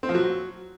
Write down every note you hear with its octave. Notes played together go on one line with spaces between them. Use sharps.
C4
F3
F#3